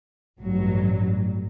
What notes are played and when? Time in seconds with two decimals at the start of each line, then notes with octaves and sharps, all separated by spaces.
0.38 A1 G2 F#3